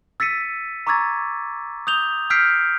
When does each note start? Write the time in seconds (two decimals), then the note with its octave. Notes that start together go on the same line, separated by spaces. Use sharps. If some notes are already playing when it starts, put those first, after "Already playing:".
0.20 E6 A6 B6 C#7 D#7
0.87 A#5 C#6 D6 E6 G#6 A6
1.87 D#6 G6 F7 G7
2.30 E6 F6 G6 B6 C7 D7